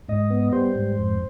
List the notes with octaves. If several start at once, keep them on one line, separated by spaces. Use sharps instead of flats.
G#2 D#5
B3
G3 C5
G#2
F2